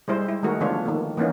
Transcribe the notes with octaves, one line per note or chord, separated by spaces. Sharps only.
G3 G#3 E4 C5
E4
D#3 G#3 A3 F#4 A#4
D3 F3 B3 D4 F4 C#5
D#3 A#3 A4
E3 A#3 B3 C#4 D#4